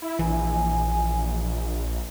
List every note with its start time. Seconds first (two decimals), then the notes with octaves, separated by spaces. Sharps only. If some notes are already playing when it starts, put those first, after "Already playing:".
0.02 E4
0.19 A#1 E3 G#5